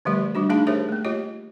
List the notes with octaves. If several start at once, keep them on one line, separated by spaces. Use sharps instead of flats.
D3 F3 G3 A3 G4 D5
D#3 G3 D4 F#4
A3 D4 D#4 G#4 F5 A5
G4 G#4 A#4 C5 C#5 E5
A3 A#3
F4 G4 C#5 D#5